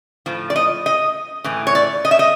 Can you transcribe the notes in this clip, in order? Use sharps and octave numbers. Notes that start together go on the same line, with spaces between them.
A2 F3
D5
D#5
D#5
A2 E3
C#5
D5
D#5
E5
D#5